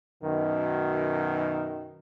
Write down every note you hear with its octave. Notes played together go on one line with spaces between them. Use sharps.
F#2 B2 D#3